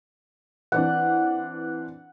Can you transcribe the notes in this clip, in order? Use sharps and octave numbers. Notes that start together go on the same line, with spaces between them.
E3 C4 D4 F#5